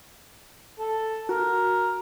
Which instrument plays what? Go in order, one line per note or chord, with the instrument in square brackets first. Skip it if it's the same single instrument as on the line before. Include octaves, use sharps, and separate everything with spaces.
[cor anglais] A4
[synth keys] F#4 [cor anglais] A#4